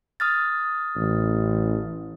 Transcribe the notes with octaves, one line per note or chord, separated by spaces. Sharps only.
D#6 F6 A6
A1